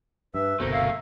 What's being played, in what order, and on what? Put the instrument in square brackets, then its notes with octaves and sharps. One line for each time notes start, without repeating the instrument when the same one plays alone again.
[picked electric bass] G2 [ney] B4 [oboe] E5
[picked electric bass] G1 C2 B2 [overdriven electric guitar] A3 A#3 [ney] C5
[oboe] E5 [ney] F5